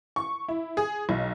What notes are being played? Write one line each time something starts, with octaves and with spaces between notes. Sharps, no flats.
C#6
E4
G#4
B1